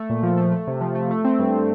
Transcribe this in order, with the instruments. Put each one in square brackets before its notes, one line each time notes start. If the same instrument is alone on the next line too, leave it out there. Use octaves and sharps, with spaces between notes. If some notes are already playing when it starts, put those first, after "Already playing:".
Already playing: [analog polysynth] A3
A#2
F3
A3
A3
C3
F3
A3
A3
C4
G2